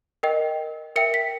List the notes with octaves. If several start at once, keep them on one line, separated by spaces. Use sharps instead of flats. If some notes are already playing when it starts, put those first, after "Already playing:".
A#4 D#5 G5
A#4 E5 G5 C#7
B6